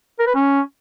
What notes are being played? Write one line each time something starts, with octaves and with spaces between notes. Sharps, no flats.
A#4
B4
C#4